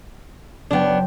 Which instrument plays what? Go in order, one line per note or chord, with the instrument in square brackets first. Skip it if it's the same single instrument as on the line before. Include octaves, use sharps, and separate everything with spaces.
[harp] F#1 F#3 G5 [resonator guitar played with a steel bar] B3 D4